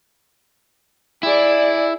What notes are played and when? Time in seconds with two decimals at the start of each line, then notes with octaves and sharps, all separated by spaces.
1.23 E4 G#4 D5